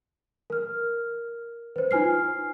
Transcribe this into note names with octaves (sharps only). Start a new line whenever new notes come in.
A#4 F6
B4 C5
D#4 F4 G#5 F6 C7